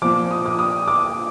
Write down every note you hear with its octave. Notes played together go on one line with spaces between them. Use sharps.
A#2 F3 D6
D#6
D6
D#6
D6